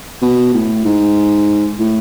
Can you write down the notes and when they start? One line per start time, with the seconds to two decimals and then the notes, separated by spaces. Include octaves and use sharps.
0.22 B2
0.54 A2
0.85 G#2
1.79 A2